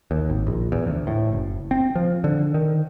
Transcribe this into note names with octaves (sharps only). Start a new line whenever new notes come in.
D#2
G#1
A#1
E2
D2
A2
F#1
C4
F3
D3
D#3